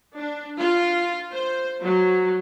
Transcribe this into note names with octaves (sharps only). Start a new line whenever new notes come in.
D4
F4
C5
F#3